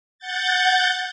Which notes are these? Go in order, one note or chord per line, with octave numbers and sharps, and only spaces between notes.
F#5 G6 A6